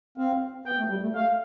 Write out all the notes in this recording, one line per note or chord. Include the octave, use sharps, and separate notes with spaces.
C4 F5
B3 G5
A3
G3
A3
A3 F5